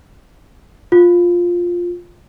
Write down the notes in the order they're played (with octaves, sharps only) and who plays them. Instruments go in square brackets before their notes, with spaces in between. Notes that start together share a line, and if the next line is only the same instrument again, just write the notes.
[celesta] F4